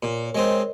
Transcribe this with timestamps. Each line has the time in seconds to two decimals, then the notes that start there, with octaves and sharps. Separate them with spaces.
0.02 A#2 A#4 C#5
0.23 A#4 C#5
0.35 G#3 C4
0.45 C5 D#5